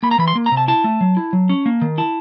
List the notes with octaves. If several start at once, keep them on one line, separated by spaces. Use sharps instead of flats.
A#3 B5
A#5
E3 B5
C6
A#3
A#5
C3
A5
E4 A5
A3
F#3
E4
F#3
C#4
A#3
D#3
E4 A5